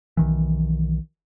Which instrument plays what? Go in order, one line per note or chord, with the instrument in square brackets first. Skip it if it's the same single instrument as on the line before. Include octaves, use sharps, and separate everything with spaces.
[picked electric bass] B1 D#3 E3